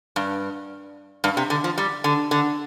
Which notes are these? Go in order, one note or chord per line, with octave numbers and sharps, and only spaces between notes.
G2
G2
C3
D3
F3
G3
D3
D3